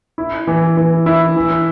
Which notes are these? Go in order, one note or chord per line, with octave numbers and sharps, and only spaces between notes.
E4
E3
E3
E4
E3